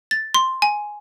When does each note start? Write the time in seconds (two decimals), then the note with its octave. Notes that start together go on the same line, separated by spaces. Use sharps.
0.11 A6
0.34 C6
0.62 G#5